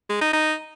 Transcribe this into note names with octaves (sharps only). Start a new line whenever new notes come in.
G#3
D#4
D#4